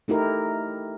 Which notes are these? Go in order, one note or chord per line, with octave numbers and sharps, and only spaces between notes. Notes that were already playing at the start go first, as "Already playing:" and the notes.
A3 D#4 E4 G4 A#4